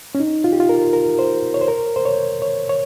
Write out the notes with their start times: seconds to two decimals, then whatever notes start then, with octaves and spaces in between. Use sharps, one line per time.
0.15 C#4
0.20 D#4
0.44 F4
0.53 G4
0.60 F4
0.69 A#4
0.93 A#4
1.19 C5
1.54 C#5
1.61 C5
1.68 A#4
1.96 C5
2.05 C#5
2.42 C#5
2.69 C#5